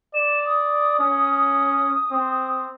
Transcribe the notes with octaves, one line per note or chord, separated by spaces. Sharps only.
D5 E7
D#6
C#4
C4